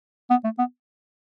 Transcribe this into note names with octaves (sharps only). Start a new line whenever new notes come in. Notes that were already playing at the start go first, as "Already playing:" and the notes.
B3
A3
B3